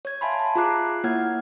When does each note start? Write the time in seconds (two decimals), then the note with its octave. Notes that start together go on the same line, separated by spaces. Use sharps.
0.05 C#5 G#6
0.21 E5 F5 G#5 A5 B5 C6
0.39 A5
0.56 F4 G#4 A#5 D6 F#6 C7
1.04 A#3 E4 C#5 F#5 F6 G#6